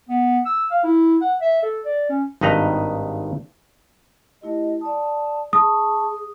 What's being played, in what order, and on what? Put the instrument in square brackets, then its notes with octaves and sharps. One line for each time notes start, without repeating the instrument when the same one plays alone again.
[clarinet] B3
E6
F5
E4
F#5
E5
A4
D5
C#4
[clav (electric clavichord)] G#1 G2 D#4 B4 D#5 A#5
[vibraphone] A3 E4 G4 [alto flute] D#5
[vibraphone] D5 D#6 [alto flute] A5
[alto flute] G#4 [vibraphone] A5 B5 C#6 [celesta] D#6